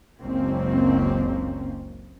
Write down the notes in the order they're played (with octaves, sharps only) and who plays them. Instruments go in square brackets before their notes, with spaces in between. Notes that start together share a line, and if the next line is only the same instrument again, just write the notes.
[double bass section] F#1 C#2 A#3 C4 C#4